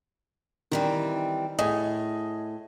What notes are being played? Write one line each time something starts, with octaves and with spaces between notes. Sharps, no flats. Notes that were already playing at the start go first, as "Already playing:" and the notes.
D#3 E3 G3 C4
A2 G#4 D#5 G#5